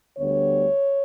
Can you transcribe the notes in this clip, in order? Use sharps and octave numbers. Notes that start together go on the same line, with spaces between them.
D2 D3 G3 B3 C#5